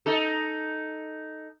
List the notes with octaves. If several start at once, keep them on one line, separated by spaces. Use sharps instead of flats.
D#4 A4